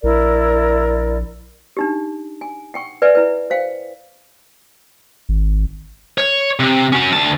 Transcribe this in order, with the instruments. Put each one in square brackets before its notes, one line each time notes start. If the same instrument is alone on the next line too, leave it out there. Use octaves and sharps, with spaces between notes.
[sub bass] A#1 [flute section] E4 A#4 D5
[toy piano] D4 D#4 G4
G#5
F#5 G5 C#6
B4 D5 E5 F#5 G#5
E4 B4
C5 F5 G5
[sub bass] G#1
[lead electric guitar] C#5
C3
C#4 F#4
D2 A5